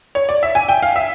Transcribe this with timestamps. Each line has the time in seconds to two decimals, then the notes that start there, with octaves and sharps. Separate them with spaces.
0.15 C#5
0.29 D5
0.43 E5
0.55 G#5
0.68 G5
0.82 F5
0.96 E5